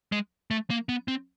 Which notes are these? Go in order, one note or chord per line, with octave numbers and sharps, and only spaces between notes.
G#3
A3
A#3
B3
C4